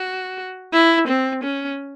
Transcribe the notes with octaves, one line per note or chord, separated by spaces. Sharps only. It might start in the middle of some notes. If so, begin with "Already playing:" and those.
Already playing: F#4
E4
C4
C#4